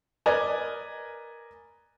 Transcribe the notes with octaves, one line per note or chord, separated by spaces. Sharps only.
A#4 B4 D5 D#5 G#5 A#5